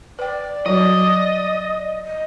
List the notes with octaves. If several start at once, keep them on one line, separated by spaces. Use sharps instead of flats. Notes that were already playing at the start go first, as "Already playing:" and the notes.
B4 D5 G5
F#3 G3 F#4 D#5
D#5